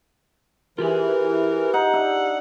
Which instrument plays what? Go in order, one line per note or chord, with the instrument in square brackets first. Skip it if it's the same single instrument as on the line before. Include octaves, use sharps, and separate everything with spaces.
[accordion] E3 [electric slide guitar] F4 G4 G#4 [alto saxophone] A#4
[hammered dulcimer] D#4 [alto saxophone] F#5
[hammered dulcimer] D4 E5